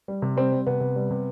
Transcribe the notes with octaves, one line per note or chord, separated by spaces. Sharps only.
G3
C3
G3 C4
G3
C3 B3
C3
G3
C3